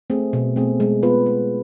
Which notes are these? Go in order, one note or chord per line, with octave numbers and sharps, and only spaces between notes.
A3 C4 G#4
B2
A3 C4 G#4
G#3
B3 F4 B4
G#3